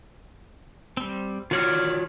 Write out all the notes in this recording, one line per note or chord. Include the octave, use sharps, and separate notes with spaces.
G3 C4
D#3 F4 F#4 C#5 D5 F6